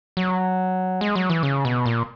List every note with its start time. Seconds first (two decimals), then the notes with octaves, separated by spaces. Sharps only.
0.17 F#3
1.01 G#3
1.15 F#3
1.30 E3
1.43 C#3
1.65 B2
1.86 A#2